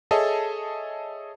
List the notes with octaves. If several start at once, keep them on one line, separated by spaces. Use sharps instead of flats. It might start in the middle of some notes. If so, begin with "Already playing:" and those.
G#4 A4 C#5 D#5 E5 A5